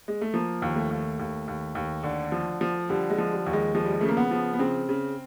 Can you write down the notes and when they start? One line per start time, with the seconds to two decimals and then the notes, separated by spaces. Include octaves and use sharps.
0.08 G#3
0.21 A3
0.34 F3 A#3
0.62 D#2
0.76 A3
0.90 D#2
1.19 D#2
1.48 D#2
1.75 D#2
2.03 D3
2.32 F3
2.61 F3
2.89 D3 G3
3.10 G#3
3.18 F3
3.33 G3
3.46 D#2
3.53 G#3
3.75 F3 G#3
3.85 G3
3.93 G#3
4.01 C#3 A3
4.09 A#3
4.17 B3
4.31 F3
4.53 B3
4.59 C#3 C4
4.89 C#3